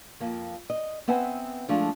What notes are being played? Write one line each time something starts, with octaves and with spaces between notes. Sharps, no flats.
F2 A#3
D#5
B3 C4 B4 E5 F#5 G#5
F3 G#3 A3 D4 F4